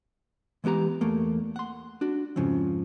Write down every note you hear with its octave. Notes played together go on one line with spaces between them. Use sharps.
E3 G#3 B3 G4 A#5
E2 A3 A#3
F#5 C6
D4 F#4
F2 G#2 C#3 F3